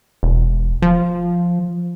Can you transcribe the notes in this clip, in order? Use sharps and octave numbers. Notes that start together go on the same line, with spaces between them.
E1
F3